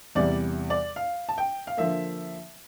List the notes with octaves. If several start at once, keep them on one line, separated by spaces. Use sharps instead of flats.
E2 C3 E3 G3 D5
D5
F5
A5
G5
F5
D3 F3 A#3 E5